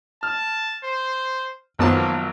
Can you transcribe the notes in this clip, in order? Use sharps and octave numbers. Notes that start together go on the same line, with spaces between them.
A5 F6
C5
G#1 F#2 F3 F#3 A#3 B3 A5